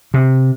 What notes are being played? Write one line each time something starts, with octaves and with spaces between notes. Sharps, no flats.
C3